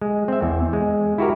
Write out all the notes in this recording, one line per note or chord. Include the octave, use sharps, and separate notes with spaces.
G#3
C4 E5
E2
G#3
E4 F#4 G4 A#4